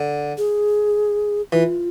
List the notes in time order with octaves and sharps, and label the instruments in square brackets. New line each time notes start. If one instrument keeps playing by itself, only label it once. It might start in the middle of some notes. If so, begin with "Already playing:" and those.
Already playing: [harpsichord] D3
[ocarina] G#4
[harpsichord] E3 [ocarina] F4